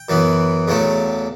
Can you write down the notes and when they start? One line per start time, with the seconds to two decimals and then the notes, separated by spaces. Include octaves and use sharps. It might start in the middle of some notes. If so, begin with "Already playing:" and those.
Already playing: G5
0.09 F#2 E3 B3
0.68 E2 C#3 F#3 A3